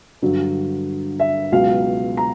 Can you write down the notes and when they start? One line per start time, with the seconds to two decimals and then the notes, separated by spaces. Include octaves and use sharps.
0.22 G2 D3 F#3
1.20 E5
1.52 C#2 B2 F#3 F5
2.17 A#5